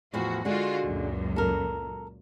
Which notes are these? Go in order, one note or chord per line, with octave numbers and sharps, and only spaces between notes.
E2 A2 F3 F#4
D3 G#3 F4 F#4
C#2 F#2 A#2
A4 A#4